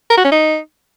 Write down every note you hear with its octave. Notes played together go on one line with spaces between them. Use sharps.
A#4
F#4
C#4
D#4